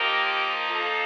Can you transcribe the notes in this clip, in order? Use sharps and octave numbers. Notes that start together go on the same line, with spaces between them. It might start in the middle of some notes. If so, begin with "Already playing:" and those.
Already playing: F3 A#3 D#4 G4 A#4
F4 A4